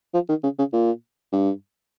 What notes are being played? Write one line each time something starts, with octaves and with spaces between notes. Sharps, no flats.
F3
D#3
C#3
C#3
A#2
G2